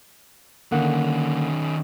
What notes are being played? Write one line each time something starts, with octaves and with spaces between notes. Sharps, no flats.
D3 D#3 A#3 C#4 F#5